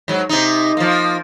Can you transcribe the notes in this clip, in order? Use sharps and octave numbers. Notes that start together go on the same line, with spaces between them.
G#2 F#3
C3 D#4
F3 A#3